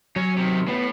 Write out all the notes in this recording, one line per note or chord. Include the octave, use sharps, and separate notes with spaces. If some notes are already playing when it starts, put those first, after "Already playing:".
F#3 C#4
C3 D#3
A2 B3